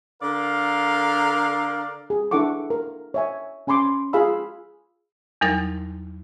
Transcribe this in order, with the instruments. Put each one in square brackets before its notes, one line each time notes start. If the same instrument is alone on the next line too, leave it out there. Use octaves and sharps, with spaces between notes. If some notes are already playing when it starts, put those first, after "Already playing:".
[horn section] D3 A#4 D5 F5
[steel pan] G#4
D4 E4 A4 F#5 C#6 D6
A#4
C#5 E5 G#5
C#4 G#5 B5 C6 D6
F4 G#4 F5 B5 E6
[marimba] E2 F#3 G3 D#4 A#4 A6